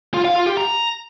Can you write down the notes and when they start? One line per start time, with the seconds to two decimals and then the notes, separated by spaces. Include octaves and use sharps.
0.14 F4
0.25 F5
0.36 F4
0.47 G4
0.57 A#5